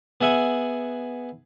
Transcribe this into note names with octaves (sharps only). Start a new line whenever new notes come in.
B3 G#4 E5 F#5 G#5